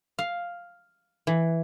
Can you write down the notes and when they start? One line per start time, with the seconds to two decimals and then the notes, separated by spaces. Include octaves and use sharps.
0.19 F5
1.27 E3